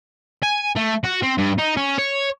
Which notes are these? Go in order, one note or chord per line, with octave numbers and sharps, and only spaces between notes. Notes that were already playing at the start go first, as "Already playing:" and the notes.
G#5
A3
F#4
C4
G2
D#4
C#4
C#5